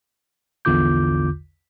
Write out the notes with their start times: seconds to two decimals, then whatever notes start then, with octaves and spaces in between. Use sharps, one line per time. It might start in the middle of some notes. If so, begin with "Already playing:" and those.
0.65 A#1 E2 D3 F4 D6 G6